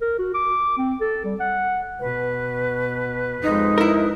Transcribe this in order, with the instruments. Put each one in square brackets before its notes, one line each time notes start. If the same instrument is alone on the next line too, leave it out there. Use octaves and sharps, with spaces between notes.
[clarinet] A#4
F#4
D6
C4
A4
G3
F#5
[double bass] B2 [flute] B4
[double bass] F2 G#3 [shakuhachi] D#4
[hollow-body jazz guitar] E4 A#4